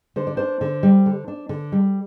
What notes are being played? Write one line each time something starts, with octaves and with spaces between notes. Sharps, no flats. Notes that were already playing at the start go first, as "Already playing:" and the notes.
D3 C5
D5
D4 C5
D3
G3
D3
D4
D3
G3